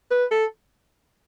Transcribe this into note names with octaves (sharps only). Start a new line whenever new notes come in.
B4
A4